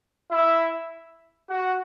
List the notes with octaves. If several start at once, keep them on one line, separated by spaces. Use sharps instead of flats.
E4 E5
F#4 F#5